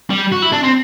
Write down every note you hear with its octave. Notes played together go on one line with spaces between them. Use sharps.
G3
F#4
E4
D4
C4